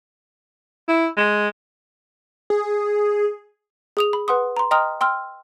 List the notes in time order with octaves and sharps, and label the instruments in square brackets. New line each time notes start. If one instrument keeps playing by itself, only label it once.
[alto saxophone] E4
G#3
[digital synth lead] G#4
[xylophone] G#4 D#6 F7
B5
B4 F#5 C6 D#6
A#5 C6
D#5 G5 A#5 C6 D#6 F6
G5 C6 E6 F6